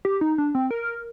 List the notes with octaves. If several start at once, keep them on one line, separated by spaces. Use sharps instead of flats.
G4
D#4
D4
C4
A#4